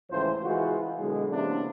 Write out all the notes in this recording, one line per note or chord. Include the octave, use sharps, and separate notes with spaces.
C#2 A2 E3 F3 C5
E3 G#3 F4 F#4
B2 D3 F#3 G#3
C3 E3 A#3 B3 C#4 D4